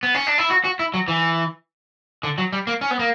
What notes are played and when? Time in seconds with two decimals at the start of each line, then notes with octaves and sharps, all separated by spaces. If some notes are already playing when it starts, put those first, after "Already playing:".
0.03 B3
0.14 C#4
0.27 D4
0.38 E4
0.50 F#4
0.64 F#4
0.79 E4
0.94 F#3
1.08 E3
2.23 D3
2.38 F#3
2.53 G3
2.67 A#3
2.81 C#4
2.91 B3
2.99 A#3